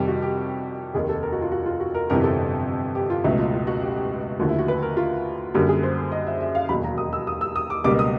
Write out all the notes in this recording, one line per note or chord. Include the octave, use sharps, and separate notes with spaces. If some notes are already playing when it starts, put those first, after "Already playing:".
Already playing: F2 C3 D#3 G3 G4
F#4
G4
F1 D#2 D#3 G#4
A4
A#4
F#4
F4
F#4
F4
F#4
A#4
G1 F2 C3 E3 A#4
A4
G4
F4
C#2 B2 F#3 A3 E4
F4
F4
F#4
G4
G4
D#2 D3 F3 A3 F#4
E4
F#4
B4
A#4
F4
F#2 D3 G3 A#3 F#4
G#4
C5
D#5
E5
E5
F5
E1 D#2 D#3 F#3 A#3 B5
A#5
D#6
E6
D#6
E6
D#6
D6
C#2 B2 G3 A#3 D6
D#6